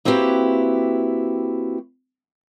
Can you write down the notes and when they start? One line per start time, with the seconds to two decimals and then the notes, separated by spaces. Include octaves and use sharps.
0.05 A#3 C4 E4 F#4 G4 B4